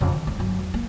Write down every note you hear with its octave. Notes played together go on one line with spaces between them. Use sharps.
F2 C#3
D#3
G3 C4
G1 F#3
E2
A#3